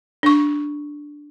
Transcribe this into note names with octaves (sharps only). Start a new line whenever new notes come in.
D4 C#6